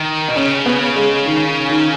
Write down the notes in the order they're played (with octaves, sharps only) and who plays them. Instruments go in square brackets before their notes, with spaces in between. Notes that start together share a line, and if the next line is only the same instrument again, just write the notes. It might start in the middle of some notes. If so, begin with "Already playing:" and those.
Already playing: [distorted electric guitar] D#3
B2
[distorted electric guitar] C#3 [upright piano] C#4
[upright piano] B3
G#3
D#3
D#3